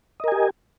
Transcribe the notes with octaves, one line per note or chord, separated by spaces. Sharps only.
G4 A#4 D#5 G#5